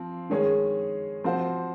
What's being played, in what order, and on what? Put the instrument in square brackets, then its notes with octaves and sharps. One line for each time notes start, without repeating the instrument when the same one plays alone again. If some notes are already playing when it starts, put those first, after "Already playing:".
Already playing: [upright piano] F3 C4
D#3 G#3 C#4 G#4
F3 C4 F#4 C5